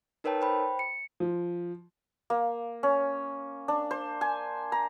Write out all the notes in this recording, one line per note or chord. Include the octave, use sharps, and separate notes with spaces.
D#4 A#4 B4 C#5 G5 A5
C5 G5 B5
C#7
F3
A#3
C#4
D4
C5
G#5
A#5